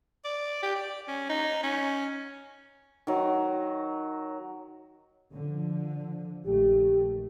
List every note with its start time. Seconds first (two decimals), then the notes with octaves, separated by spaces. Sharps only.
0.24 D5
0.62 G4
0.75 D5
1.08 C#4
1.29 D#4
1.63 C#4
3.07 D#3 F#3
5.31 D3 F3
6.46 A#1 D#3 A3 G4